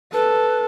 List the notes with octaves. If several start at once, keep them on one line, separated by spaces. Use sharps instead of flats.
A4 B4